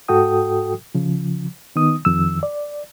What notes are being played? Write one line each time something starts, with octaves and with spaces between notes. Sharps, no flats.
G#2 F#4 A4 G5 D#6
C#3 F3
D#3 B3 D#4 D#6
F2 D#3 E6
D5